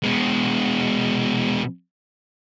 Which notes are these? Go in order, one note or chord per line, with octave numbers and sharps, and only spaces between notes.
B2 G#3